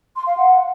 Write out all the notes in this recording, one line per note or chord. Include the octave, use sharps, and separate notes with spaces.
C6
F5
F#5